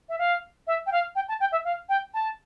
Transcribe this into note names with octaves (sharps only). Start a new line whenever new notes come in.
E5
F5
E5
G5
F5
G5
A5
G5
E5
F5
G5
A5